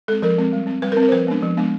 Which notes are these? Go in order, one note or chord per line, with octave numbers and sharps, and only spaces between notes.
G#3 C4 A4
F3 A#4
G#3 C4
G3
C4
G3 B4
A#4
C4
A#4
C5
F3 B4
G#3 B3 D4
F3
G#3 B3 D4